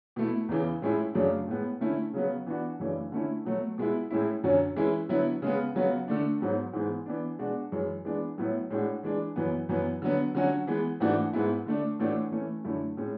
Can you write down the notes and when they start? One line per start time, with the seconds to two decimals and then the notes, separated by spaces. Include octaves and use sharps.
0.16 B2 A3 E4
0.49 E2 C#3 E3
0.82 A2 G#3 C#4 E4
1.15 F#2 C#3 F#3 A3 D4
1.48 A2 G#3 B3
1.81 D3 A3 C#4 E4
2.13 C#3 F#3 B3
2.46 E3 B3 D4 F#4
2.79 F#2 C#3 E3 A3 D4
3.12 D3 A3 C#4 E4
3.45 B2 F#3 A3
3.78 B2 G#3 B3 E4
4.11 A2 G#3 C#4 E4
4.44 F#2 D3 F#3 C#4
4.76 E3 G#3 C#4 E4
5.09 D3 F#3 B3 E4
5.42 C#3 G#3 B3
5.75 C#3 F#3 B3 F#4
6.08 D3 A3 D4
6.40 G#2 F#3 B3
6.73 G#2 E3 G#3 B3
7.06 E3 B3 D4
7.39 B2 G#3 D4 F#4
7.72 F#2 E3 G#3
8.05 E3 G#3 B3 D4
8.38 A2 F#3 B3 E4
8.70 A2 G#3 D4 F#4
9.03 E3 G#3 D4
9.36 F#2 E3 B3
9.69 F#2 E3 B3
10.02 D3 F#3 B3
10.35 D3 F#3 C#4 F#4
10.67 E3 G#3 B3
11.00 G#2 E3 A3 D4 F#4
11.33 G#2 G#3 B3 E4
11.66 D3 A3 D4
11.99 A2 E3 A3 D4 F#4
12.32 E3 A3 C#4
12.64 F#2 D3 A3 E4
12.97 A2 G#3 C#4